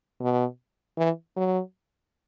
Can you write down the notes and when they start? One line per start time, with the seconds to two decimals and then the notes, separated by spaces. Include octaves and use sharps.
0.21 B2
0.98 E3
1.36 F#3